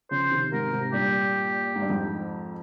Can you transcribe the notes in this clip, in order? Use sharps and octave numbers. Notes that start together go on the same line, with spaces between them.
C#3 F3 C5
C3 D#3
G#2 C3 A#4
G#2 C3
G2 A#2 G4
G#2
G2
F2 G#2